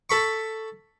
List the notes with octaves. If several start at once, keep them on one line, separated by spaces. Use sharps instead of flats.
A4 B5 C#6